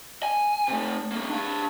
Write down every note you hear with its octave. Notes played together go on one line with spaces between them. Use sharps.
G#5
C3 A3
G3 A#3
D4 F5